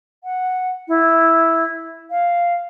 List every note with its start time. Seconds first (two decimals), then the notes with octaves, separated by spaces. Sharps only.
0.24 F#5
0.88 E4
2.10 F5